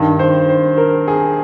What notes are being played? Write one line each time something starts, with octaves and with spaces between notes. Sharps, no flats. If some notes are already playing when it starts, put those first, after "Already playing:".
Already playing: G2 D#3
C5
C5
A#4
G#4